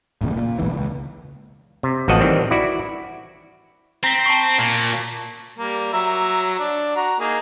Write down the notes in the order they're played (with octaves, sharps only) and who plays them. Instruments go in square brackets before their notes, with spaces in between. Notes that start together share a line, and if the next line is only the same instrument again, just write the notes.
[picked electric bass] D#1 A1 A#2 C#3
A#2
B1 E2 G#2 E3
C#2
[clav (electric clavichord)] C3
A1 F3 F#4 D#5 F#5 A5
D#3 E3 G3 C4
E4 F#4 D5
[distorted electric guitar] C4 [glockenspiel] A#5 A#6 B6
[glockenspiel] A5 C#6
[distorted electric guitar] A#2
[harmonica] G3 A#3
F#3 E5 A#5
D4
F#4 A#5
A#3 D#4 G#4